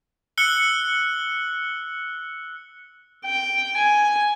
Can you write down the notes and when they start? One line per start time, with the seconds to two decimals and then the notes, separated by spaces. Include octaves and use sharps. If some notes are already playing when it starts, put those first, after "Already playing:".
0.38 E6 F#6 C#7 G7
3.25 G5
3.78 G#5